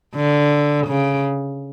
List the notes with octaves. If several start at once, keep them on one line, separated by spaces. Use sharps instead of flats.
D3
C#3